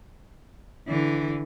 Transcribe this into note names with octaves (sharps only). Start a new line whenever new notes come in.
D3 E3